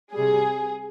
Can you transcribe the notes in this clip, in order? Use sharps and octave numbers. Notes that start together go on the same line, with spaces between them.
C3 G3 G#4